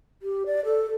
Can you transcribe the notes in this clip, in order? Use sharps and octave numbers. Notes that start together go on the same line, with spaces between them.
G4
D5
A4